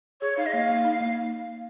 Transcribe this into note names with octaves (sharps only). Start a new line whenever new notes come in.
G#4 C#5
D#4 F5
D#5
A#3 F5
A#3
D#4
A#3